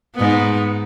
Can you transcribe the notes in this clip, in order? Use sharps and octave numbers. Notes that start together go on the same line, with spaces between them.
G#2 B3